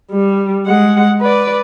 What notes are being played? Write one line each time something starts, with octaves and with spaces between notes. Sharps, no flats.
G3
G#3 F#5
B4 D5